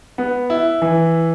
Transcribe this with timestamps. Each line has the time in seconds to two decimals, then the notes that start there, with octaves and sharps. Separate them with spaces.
0.18 B3
0.50 E4
0.82 E3